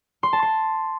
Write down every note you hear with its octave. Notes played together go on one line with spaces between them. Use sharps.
C6
A5
C6